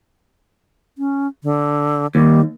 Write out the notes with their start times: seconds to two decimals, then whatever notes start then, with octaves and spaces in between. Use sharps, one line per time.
0.98 C#4
1.44 D3
2.15 D#2 G3